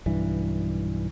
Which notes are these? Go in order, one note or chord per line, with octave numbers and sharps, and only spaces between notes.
B1 G2 E3